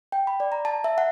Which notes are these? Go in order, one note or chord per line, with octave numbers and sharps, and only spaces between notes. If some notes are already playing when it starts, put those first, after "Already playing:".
G5
B5
D5
A#5
A5
E5
F#5